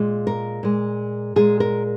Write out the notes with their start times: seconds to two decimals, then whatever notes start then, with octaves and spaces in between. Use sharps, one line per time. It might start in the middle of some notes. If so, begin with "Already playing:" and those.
Already playing: A#2 G#3
0.27 A#4
0.63 A#2 G#3
1.36 A#2 G#3 G#4
1.60 A#4